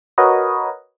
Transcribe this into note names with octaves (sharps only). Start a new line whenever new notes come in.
F#4 A#4 B4 C#5 D#5